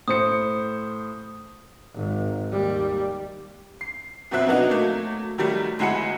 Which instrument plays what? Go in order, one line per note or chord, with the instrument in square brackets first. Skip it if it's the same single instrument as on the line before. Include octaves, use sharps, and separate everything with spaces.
[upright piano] A2 C5 C#7 [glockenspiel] D#6
[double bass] G#1
D#2 G3
[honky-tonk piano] C7
F2 B2 F#3 C4 E5 F#6
B2 F#3 B3 D4 D#4 F#4
F#3 A3 A#3
D#3 F#3 G3 A3
G1 G#3 E4 F#4 G#4 C#7